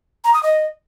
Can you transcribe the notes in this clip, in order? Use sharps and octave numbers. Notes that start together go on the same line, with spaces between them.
A#5
D#6
D#5